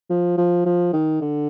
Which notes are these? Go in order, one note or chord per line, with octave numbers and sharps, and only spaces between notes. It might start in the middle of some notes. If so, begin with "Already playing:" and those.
F3
F3
F3
D#3
D3